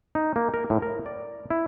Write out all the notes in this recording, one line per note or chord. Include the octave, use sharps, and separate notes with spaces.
D#4
A#3
A#4
A2
A#4
D5
E4